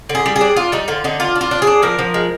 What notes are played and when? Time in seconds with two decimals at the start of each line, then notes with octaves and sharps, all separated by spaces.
0.09 D3
0.15 G#4
0.26 G3
0.36 G#4
0.41 D4
0.56 D4 F4
0.72 G3 D#4
0.88 D3 F4
1.04 D3 D#4
1.20 D4 F4
1.35 D4
1.41 F4
1.51 D4
1.62 G#4
1.67 D4
1.82 F3 A#4
1.99 F3
2.14 G#3